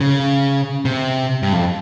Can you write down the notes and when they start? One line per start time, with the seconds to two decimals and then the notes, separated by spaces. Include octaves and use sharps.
0.01 C#3
0.85 C3
1.43 G2
1.53 F2